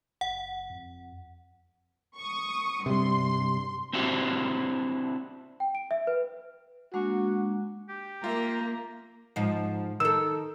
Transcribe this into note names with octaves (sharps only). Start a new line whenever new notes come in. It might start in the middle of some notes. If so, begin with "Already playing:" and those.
F#1 F#5
F2
C#6 D#6
G2 C3 G3 C6
C4 D4 E4 F#4 G4 C5
G5
D7
E5
B4
G#3 A#3 D4 F#4
G4
A#3 F4 E5 A#5
G#2 F3
D#3 A4 E6